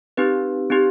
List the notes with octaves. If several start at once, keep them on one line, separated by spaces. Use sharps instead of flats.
C4 D#4 G4 B4
C4 D#4 G4